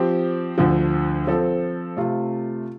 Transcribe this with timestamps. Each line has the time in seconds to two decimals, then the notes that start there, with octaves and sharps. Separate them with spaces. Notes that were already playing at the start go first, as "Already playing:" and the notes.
Already playing: F3 C4 G4
0.58 D2 D3 F3
1.27 F3 C4 A4
1.97 C3 A3 F4